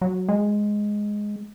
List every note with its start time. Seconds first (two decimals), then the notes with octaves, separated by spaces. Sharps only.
0.01 F#3
0.29 G#3